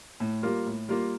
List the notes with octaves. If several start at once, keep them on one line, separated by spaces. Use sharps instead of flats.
A2
G3 A#3 F4 A#4
A2
G3 A#3 F4 A#4